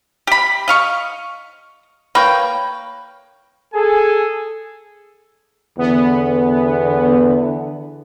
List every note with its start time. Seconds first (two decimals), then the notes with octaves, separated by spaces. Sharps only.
0.27 G4 B5
0.68 D#5 F5 C#6
2.15 A#3 B4 C#5 G5
3.74 G#4 A4 G#5
5.79 E2 D3 B3